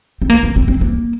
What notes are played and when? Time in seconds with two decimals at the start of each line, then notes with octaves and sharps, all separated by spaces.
0.22 C4
0.30 A#3
0.43 C4
0.56 C4
0.68 C4
0.81 A#3